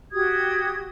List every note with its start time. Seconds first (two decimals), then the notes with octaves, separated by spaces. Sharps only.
0.12 F#4 G4 D#6 G#6